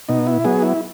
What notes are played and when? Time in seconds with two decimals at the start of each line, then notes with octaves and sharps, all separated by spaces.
0.09 B2 D#4
0.27 E4
0.44 F#3 B3 G#4
0.62 E4